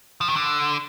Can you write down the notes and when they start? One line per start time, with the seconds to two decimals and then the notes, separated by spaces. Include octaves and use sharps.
0.21 F3
0.29 D#3
0.36 D3